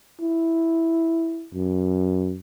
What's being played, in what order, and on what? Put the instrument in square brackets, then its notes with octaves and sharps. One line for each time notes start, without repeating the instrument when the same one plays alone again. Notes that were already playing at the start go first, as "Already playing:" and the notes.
[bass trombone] E4
F#2